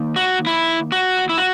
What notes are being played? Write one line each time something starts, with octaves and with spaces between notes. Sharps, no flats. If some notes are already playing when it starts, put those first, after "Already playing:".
Already playing: D#3 A#3 D#4
F#4
E4
F#4
E4
F#4